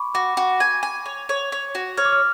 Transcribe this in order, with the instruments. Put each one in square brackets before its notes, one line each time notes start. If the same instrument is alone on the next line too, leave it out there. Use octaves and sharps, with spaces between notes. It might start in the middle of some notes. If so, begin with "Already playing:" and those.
Already playing: [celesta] B5 C#6 D6
[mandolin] F#4 [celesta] D6
[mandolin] F#4
G#5
G#5
C#5
C#5
C#5
F#4
[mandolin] C#5 [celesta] F6
[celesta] D6
F6